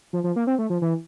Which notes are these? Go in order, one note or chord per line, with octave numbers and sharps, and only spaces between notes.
F3
F3
A#3
C4
A3
F3
E3